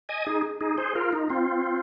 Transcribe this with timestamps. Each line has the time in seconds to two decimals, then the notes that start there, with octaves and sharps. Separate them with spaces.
0.09 D#5 G#5
0.27 D#4 G#4
0.61 D#4 G#4
0.78 G#4 C5
0.95 F4 A#4
1.13 D#4
1.30 C4 F4